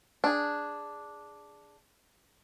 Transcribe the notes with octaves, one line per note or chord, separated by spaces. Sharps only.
D4 G#4